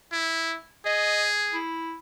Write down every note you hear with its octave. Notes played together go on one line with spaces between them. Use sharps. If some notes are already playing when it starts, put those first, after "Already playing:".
E4
G#4 D#5
E4